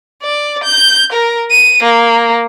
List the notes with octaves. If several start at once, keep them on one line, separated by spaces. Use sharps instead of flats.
D5
G6
A#4
D#7
A#3